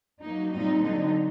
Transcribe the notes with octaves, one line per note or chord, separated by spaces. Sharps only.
F#3 A#3 D#4
A#2 G3 C4 D#4
D3 F#3 C4 D#4